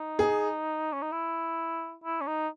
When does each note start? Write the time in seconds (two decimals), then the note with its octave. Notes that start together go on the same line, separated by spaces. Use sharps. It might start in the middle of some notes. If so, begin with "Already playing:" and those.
Already playing: D#4
0.19 G#4
0.92 C#4
1.02 D#4
1.12 E4
2.04 E4
2.21 C#4
2.27 D#4